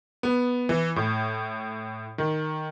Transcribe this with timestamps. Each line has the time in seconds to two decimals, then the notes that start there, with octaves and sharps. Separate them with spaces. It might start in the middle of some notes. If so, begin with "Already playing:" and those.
0.23 B3
0.69 E3
0.96 A2
2.18 D#3